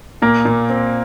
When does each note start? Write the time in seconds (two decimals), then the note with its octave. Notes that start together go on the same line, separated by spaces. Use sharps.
0.22 A#2 A#3 A#4
0.45 A#2
0.70 C4